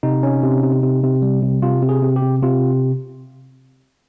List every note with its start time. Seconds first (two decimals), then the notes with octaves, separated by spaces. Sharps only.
0.03 C3 D#4
0.23 C#4
0.43 C3
0.63 C3
0.83 C3
1.03 C3
1.22 G3
1.43 C3
1.62 C3 F4
1.82 C3
1.89 G#4
2.02 C3
2.16 G4
2.22 C3
2.42 C3 F4